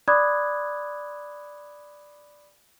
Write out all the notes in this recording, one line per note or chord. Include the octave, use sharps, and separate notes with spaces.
D5 B5 D6 D#6 F#6 G#6